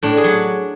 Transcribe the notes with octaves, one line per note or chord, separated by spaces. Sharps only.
A2 D4
G#4
F#3